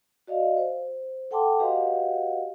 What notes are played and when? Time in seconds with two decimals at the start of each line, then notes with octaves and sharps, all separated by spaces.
0.27 F#4 D5 D#5 F5
0.57 C5
1.31 A4 F#5 G5 A5 C6 D6
1.60 F#4 G4 B4 D#5 F5 F#5